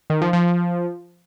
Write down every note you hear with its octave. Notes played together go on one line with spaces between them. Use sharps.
D#3
F3
F3